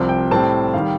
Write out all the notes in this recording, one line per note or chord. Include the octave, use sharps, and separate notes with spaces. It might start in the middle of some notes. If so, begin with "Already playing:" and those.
Already playing: C2 C3 F3 C4
G5
A2 G3 C4 A5
D#3 G3 F5